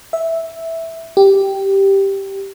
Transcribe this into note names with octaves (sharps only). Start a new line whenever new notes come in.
E5
G4